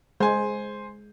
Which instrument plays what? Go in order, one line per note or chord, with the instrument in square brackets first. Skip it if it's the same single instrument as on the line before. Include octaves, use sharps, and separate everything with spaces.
[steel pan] G#3 [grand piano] C5 G#5